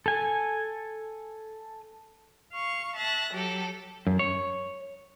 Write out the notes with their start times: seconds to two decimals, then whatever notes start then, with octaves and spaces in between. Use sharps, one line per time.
0.06 A4 G#5
2.52 F5 C#6
2.95 E5 A5 F#6 A#6
3.33 F#3 G4 A4
4.07 F#2
4.19 C#5